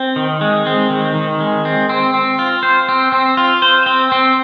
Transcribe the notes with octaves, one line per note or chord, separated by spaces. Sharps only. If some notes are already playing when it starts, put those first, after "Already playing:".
Already playing: C4
D#3
G#3
C4
D#3
D#3
G#3
C4
C4
C4
F4
C5
C4
C4
F4
C5
C4
C4